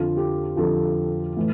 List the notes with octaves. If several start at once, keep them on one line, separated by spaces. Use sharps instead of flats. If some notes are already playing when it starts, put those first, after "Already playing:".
Already playing: F2 D3 F3 F4
G4
F2 D3 F3 A4
A2 E3